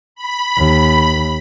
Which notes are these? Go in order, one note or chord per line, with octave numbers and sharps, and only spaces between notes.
B5
D#2